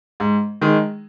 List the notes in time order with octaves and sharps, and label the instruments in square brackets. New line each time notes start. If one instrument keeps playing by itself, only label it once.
[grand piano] G#2
D#3 G#3